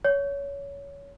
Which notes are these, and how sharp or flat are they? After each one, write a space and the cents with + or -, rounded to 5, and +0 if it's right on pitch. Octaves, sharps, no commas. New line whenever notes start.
C#5 +20